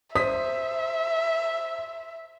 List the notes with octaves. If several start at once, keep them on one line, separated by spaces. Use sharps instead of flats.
C5 E5 D#6 B6